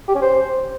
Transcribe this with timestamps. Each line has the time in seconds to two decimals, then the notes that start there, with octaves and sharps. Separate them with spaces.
0.08 G4
0.15 C#4
0.22 C5